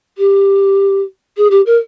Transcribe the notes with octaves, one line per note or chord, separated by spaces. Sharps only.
G4
G#4
G4
A#4